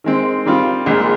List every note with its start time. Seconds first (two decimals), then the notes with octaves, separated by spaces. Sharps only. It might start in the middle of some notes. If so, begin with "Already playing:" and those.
0.04 D#3 G#3 C4
0.45 D#3 G3 C4 F4
0.86 A#1 A#2 G#3